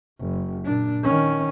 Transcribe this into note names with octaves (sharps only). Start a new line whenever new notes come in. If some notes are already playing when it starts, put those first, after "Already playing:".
F#1
A#2 D4
D#3 C#4